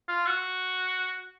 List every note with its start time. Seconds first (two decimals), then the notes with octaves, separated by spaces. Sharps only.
0.08 F4
0.26 F#4